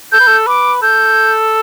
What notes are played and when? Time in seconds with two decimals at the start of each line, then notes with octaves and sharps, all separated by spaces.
0.12 A4 G6
0.20 B4
0.27 A4
0.47 B4 D6
0.82 A4 G6